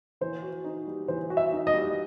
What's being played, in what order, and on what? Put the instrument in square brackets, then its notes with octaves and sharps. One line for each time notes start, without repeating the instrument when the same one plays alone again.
[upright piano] E3 [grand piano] C5
[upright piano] F#4
D#4
G3
[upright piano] E3 [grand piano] C5
[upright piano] F#4
[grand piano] E5
[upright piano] D#4
[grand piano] D#5
[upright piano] G3